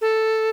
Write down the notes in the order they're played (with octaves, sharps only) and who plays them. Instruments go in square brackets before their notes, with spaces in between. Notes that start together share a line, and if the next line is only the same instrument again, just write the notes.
[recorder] A4